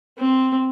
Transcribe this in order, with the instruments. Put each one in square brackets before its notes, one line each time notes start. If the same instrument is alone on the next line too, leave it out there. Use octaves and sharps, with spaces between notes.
[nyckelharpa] C4